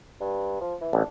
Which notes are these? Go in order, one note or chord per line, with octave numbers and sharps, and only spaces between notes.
G2
F3
E3
A1 D4